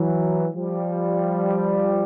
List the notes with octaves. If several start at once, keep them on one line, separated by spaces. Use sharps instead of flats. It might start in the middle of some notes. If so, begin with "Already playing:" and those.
Already playing: E3 F#3
F3 G3